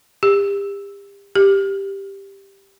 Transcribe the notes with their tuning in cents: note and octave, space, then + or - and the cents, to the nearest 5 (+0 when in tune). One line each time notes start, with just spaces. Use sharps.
G4 +35
G4 +5